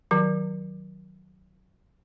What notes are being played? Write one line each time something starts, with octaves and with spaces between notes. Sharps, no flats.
D#3 F#3